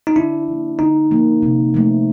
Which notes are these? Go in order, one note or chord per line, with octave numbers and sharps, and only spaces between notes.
D#4
D3 D4 E4
F3 A#3
D3 D#4
F3 A#3
C3
F3 A3